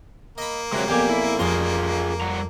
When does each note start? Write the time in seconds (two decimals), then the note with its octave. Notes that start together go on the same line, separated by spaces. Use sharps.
0.38 A#3 D#5 B5
0.73 C3 F#3 G#3 F#4
0.88 B1 F2 A#2 G4 G#4 D5 G#5
1.10 E4
1.39 A1 F2 F4 G#4 A#5 C6
2.21 G3 F#5 A#5